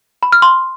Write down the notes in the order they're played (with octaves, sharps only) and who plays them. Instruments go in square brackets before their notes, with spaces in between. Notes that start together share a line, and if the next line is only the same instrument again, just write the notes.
[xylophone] B5
F6
C6